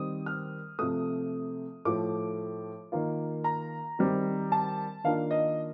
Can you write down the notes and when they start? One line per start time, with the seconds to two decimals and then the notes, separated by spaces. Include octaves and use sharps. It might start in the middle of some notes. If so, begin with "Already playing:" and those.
Already playing: D#3 G3 C4 D#6
0.26 F6
0.79 C3 F3 A3 D#6
1.85 A2 F3 A3 D6
2.92 D#3 A#3 F4
3.44 A#5
3.99 D#3 G3 C4
4.52 A5
5.04 D#3 A#3 D4 F4 F5
5.31 D#5